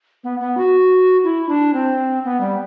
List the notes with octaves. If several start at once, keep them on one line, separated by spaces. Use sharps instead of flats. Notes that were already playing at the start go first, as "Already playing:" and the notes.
B3
B3
F#4
E4
D4
C4
B3
G3